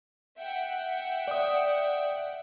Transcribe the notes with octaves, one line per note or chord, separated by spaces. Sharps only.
E5 F#5 G5
D5 D#6